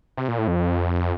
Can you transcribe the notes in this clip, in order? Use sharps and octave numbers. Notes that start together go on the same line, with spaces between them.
C3
A#2
A2
F2